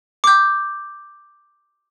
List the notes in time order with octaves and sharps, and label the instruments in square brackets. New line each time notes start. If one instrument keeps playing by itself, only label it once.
[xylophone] D6 G6